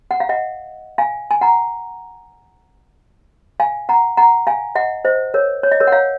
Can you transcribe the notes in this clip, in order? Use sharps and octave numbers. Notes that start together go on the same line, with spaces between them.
F#5
F5
D#5 F#5
F5 G#5
G#5
F#5 A#5
F5 G#5
F#5 A#5
F#5 A#5
F5 G#5
D#5 F#5
C5 D#5
A#4 C#5
C#5
D#5
A#4 C#5
F#5
C#5 F5